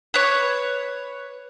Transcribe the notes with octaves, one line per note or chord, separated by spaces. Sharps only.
B4 C#5